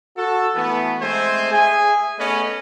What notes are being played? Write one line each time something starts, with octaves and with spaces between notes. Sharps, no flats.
F#4 A4
E3 A3 B3
G#3 A3 C4 C5 G#5
G#4 E5 G#5
A3 B3 C#4 B4 D#5